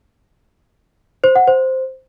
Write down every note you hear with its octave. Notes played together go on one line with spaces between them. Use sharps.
C5
F#5
C5